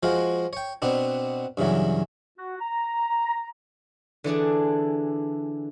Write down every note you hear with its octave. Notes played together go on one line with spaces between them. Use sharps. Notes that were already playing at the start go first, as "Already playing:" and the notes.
F3 G#3 F4 F#4
C#5 G5
B2 B3 C4 D4
G2 C#3 E3 F#3
F#4
A#5
D3 E3 D4 G#4